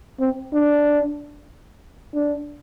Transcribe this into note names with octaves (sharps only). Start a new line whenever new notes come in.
C4
D4
D4